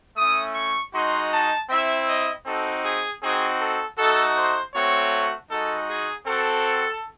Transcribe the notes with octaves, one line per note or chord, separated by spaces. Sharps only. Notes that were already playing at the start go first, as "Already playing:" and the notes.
A3 C#4 E4 D#6
C#6
G#3 D#4 F#4 C6
A5
C4 E4 E5
D#5
C4 D#4 F#4 A4
G#4
C4 D#4 F#4 G#4
A4
A3 D#4 F#4 A4
C5
A3 C4 F#4 C#5
G#3 D#4 F#4 A4
G#4
C4 F#4 A4